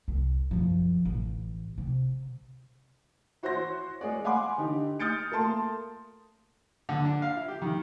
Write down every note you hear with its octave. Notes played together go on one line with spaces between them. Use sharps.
C2
F#2 F3
A1
C3
E4 F#4 C5 C#5 C6 A#6
G#3 G#4 C#5 D5
F5 F#5 G#5 B5 C6 D6
D3 D#4 G4
D#6 F6 G6 A6 C#7 D7
A3 A#3 A5 C6
D3
D4
F5
E4
G4
D#3